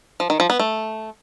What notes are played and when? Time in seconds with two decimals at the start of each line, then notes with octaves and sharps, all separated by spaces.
0.20 F3
0.30 D#3
0.40 F3
0.50 B3
0.60 A3